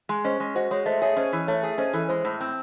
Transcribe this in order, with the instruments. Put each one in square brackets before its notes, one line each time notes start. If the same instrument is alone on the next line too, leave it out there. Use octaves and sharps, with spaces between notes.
[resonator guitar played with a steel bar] G#3
[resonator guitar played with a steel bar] C#4 [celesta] C5 D#5
[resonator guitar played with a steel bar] G#3
[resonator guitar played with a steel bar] F#4 [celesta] C5 D#5
[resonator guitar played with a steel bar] G#3 [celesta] C#5
[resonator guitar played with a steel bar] A3 [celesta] C5 D#5
[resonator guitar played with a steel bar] G#4 [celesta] C#5 E5
[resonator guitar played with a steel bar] C#4 [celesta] C5 D#5
[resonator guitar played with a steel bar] E3
[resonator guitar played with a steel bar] A3 [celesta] C#5
[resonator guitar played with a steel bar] G#4
[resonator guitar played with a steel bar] C#4 [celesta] C5 D#5
[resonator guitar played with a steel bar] E3 [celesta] A4
[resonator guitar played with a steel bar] G#3 [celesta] C5
[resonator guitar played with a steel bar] A2
C4